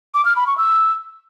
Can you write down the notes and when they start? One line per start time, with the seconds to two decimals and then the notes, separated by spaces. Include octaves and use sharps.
0.14 D6
0.25 F6
0.36 B5
0.47 C#6
0.58 E6